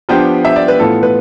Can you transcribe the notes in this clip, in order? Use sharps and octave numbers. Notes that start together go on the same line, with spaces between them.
F3 B3 D4 G4 C5 G5
E5
D5
B4
A2 E3 B3 F4 A4
B4